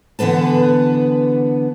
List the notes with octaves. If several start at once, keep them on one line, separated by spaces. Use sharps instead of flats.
D3 E3 B3 B4 A5